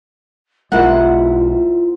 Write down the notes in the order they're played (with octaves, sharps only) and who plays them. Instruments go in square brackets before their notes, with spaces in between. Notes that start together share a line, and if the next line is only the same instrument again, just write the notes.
[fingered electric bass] B1 G#3 [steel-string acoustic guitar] A#3 E4 C5 [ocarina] F4 [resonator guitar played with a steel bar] F#5